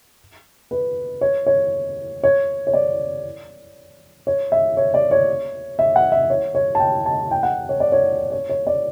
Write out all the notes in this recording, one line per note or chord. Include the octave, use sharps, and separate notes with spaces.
B4
C#5
C#5
C#5
C#5
D5
C#5
E5
C#5
D5
C#5
E5
F#5
E5
C#5
C#5
A5
G5
A5
G5
F#5
C#5
D5
C#5
C#5
C#5
D5